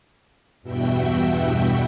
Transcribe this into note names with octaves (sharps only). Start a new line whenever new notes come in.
E2 G2 B2 F#4 E5 G5